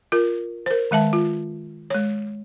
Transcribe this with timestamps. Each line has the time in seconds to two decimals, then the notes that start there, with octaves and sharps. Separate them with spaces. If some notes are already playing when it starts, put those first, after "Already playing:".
0.12 F4 A#4
0.66 A#4 C5
0.91 D#3 G#3 E5 A5
1.13 F4
1.90 G#3 C#5